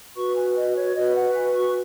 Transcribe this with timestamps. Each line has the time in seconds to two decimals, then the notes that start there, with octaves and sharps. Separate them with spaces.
0.16 F#4 B4 C#6
0.36 G#5
0.56 D#5
0.76 C#5
0.95 F#4 B4 D#5
1.15 F#5
1.34 G#5
1.55 C#6